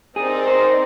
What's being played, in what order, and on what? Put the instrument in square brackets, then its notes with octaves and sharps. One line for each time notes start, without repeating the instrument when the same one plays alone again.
[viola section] C4 D#4 A#4 D5 [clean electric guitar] G#4
[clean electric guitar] C5